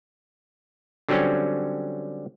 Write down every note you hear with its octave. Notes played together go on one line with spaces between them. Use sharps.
D3 F#3 G3 C4 C#4